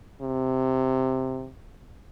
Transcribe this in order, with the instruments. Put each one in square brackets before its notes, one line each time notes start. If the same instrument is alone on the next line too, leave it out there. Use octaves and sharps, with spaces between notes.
[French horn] C3